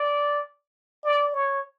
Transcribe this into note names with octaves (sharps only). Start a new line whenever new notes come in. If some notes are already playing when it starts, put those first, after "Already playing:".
Already playing: D5
D5
C#5